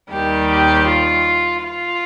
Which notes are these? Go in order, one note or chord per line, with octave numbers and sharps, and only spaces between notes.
D#2 D#3 G3 G4
G4
F4
F4